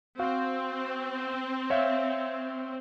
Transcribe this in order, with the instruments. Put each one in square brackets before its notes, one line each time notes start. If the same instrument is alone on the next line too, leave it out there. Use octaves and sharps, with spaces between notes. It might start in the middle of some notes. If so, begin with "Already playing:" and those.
[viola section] C4 [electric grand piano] F#4 F5
[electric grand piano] C#5 E5 F5